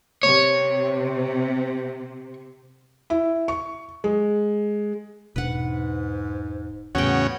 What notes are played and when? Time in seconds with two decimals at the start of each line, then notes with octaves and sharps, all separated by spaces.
0.23 C3 C#5
3.10 E4
3.48 C#6
4.04 G#3
5.36 E1 G#2 B2 D4 B4 F#5
6.95 E2 A2 C#3 B3 C#4 F#4 G5